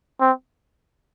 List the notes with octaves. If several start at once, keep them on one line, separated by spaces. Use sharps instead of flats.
C4